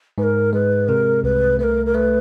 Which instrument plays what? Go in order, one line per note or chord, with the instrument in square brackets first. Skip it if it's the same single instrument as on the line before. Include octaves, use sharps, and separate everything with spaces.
[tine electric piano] G#2 [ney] B4
[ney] A#4
[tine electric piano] G#3 [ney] B4
[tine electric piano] C3 [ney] A#4
[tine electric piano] C2 [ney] B4
[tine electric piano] A3 [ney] B4
[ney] A#4
A#4
[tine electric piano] A3 [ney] B4